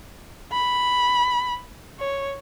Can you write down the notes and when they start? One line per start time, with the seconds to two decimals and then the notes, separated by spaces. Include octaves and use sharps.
0.52 B5
1.99 C#5